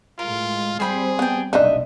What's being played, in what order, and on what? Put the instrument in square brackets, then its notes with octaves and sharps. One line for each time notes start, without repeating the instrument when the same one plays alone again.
[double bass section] A2 G#3 [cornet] F4 [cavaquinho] A#4
[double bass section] G3 C4 [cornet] G#4 [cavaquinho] C5 G5 B5
[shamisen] B3 [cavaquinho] G5 A5
[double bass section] F1 B1 A#2 [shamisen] D4 D#4 [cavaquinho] D#5 E5